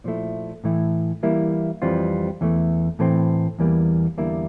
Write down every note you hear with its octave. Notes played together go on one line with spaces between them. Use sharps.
A#2 F3 A3 E4
A2 E3 A3 E4
E3 G3 A#3 E4
F2 E3 G3 C4 F4
E2 E3 A3
A2 E3 A3 C4
E2 E3 G3 A#3
E2 D3 G3 A#3 E4